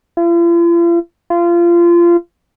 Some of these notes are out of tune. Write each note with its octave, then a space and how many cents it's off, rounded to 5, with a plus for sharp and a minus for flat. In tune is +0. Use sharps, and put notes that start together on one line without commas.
F4 -45
F4 -25